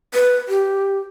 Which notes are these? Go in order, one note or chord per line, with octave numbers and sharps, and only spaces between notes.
B4
G4